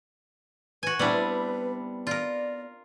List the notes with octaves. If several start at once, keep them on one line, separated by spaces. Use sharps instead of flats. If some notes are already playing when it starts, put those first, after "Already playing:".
F#4 B4 G#5
G3 B3 C4 D4 E4 B4
F4 A#4 D5